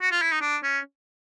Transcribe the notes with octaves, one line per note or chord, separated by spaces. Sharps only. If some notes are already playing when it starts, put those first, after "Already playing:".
F#4
F4
E4
D#4
D4
C#4